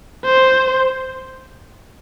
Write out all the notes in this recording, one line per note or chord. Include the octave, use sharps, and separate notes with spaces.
C5